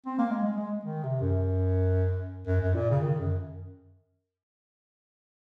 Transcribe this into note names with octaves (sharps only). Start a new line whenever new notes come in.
C4
A#3
G#3
G#3
G#3
D#3
C3
F#2
F#2
F#2
A#2
C#3
D#3
F#2